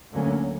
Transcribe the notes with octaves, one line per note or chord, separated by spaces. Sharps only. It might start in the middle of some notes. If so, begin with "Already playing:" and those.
D2 D3 F#3 A#3 C#4